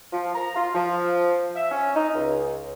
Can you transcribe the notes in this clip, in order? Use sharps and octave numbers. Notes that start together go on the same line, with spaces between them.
F3
A#5
F4
F3
E5
C#4
D#4
C#2